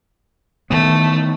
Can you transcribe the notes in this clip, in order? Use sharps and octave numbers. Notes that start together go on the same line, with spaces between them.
D#3 E3 A3 B3